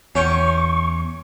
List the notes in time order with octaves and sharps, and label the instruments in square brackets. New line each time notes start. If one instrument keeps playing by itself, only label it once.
[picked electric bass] E2 [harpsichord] C#4 G5 [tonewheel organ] C#6